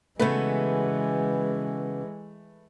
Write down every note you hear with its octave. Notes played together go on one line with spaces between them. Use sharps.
C#3 E3 G#3 A3 B3 F#4 B4